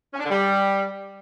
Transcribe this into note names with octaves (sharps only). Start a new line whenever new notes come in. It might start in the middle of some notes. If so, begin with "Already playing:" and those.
C#4
D4
D3
G3